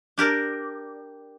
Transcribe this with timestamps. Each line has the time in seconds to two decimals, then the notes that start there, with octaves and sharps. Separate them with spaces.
0.18 D4 G4 A#4 D5